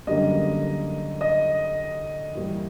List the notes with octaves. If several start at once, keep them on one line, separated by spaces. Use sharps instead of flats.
F#2 D3 G3 A#3 D#5
D#5
A2 E3 G3 A#3